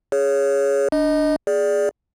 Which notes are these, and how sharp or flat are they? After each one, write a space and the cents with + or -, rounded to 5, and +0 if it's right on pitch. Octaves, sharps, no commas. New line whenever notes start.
G#4 +0 C#5 +5
D4 -5 D#5 +0
G#4 +0 D5 +0